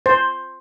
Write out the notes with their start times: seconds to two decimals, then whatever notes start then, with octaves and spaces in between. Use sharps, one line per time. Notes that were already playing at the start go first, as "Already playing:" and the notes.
0.06 C5